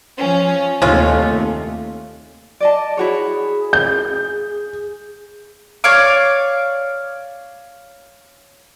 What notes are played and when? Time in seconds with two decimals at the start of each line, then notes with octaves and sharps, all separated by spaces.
0.19 F3 C#4
0.82 D#2 C3 G#3 A3 C#4 F4
2.60 D5 D#5 A5
2.97 E4 F#4 G#4 C#5
3.73 G6
5.84 C#5 D5 F5 D6